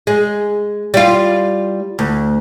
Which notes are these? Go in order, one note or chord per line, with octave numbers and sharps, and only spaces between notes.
G#3
G3 F4
D2